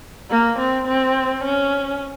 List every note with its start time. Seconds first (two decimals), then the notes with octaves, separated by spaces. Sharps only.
0.30 A#3
0.59 C4
0.87 C4
1.44 C#4